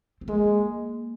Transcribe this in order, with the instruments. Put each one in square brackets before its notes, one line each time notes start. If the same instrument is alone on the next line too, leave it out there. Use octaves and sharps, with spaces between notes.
[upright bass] C4
[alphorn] G#3 [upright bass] A#3